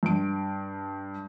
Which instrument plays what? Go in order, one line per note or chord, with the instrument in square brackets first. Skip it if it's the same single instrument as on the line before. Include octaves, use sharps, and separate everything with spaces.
[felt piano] G2 D7